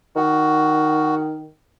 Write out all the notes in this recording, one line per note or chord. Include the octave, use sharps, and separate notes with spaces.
D#3 F#4